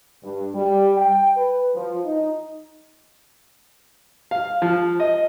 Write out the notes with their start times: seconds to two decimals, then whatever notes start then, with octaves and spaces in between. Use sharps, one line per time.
0.23 G2
0.55 G3
0.96 G5
1.36 B4
1.75 F3
2.05 D#4
4.31 F5
4.62 F3
5.00 D#5